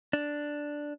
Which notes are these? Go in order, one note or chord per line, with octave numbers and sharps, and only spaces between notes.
D4